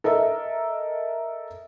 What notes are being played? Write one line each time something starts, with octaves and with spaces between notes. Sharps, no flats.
A4 A#4 D#5 E5